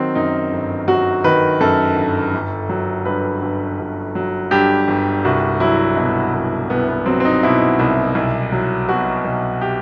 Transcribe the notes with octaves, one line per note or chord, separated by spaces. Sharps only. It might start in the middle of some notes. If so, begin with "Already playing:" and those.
Already playing: D#3 F#3 C4
F#2 D#4
G1
F#3 F#4
D#3 B4
F#2 A4
G1
G1
F#3
G2 B4
G1
G1
F#3
G2 G4
G1
C2 F#4
F#3 E4
B2
C2
C2 B3
B3
F#3 C4
C4
D#4
B2 E4
C2
B1
F#3
B2 F#4
B1
G4